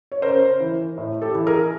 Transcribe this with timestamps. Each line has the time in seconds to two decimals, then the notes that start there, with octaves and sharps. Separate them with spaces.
0.12 C#5
0.22 C#3 A#4 C5
0.60 E3
0.98 A2
1.22 G4 A4
1.34 E3
1.47 G#4 A#4